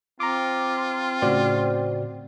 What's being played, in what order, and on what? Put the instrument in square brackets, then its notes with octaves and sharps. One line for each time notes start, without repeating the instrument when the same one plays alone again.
[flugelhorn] C4 [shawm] F4 [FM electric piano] A#5 D6
[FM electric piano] A2 C#3 [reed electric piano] F#4 C5 D5